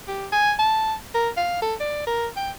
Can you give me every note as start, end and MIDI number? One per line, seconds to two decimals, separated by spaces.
0.08 0.27 67
0.32 0.53 80
0.59 0.94 81
1.14 1.29 70
1.37 1.58 77
1.62 1.74 69
1.80 2.03 74
2.07 2.27 70
2.37 2.50 79